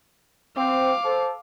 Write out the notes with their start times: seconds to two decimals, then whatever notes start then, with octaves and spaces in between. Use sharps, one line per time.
0.57 C4 F5 D6
1.05 A4 C5